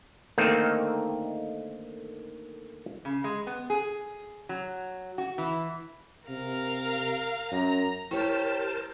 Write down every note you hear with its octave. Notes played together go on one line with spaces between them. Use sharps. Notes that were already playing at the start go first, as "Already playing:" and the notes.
D3 D#3 A3 A#3 C4 D#4
C#3
G#3
B3
G#4
F#3
F#4
E3
C3 A#4 F5
F#2 A#5
E4 G4 A#4 C5 C#5 A5